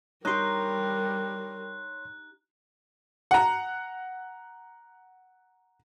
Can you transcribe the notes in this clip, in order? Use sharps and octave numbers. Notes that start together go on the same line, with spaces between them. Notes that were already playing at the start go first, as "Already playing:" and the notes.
G3 D#4 G4 A#4 C#5 C6 F#6
F#5 A#5